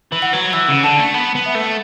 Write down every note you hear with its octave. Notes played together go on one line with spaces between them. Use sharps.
E3
F#5
F#3
E3 E6
C#3
D3 A5
A3
B3 B5
B3
E5
A3